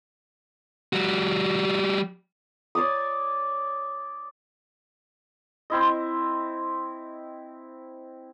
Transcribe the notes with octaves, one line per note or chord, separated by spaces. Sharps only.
G3 F#4
C#5 D5 D6 D#6
C4 E4 D#5